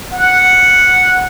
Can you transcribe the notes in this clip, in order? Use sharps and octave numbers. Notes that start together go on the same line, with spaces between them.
F#5